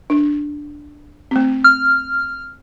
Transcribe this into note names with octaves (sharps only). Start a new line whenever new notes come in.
D4
A3 C4
F6